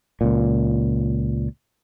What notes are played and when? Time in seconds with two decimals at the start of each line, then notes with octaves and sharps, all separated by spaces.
0.21 C#2 A#2